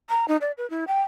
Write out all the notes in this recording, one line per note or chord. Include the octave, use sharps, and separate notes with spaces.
A#5
D#4
D5
B4
E4
G5